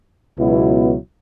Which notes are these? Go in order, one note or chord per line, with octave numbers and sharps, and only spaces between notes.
C#2 B2 F#3 B3 E4